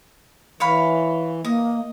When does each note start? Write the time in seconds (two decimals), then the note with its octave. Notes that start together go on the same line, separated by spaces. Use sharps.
0.60 E3 C#5 F5 B5
1.45 A#3 D#5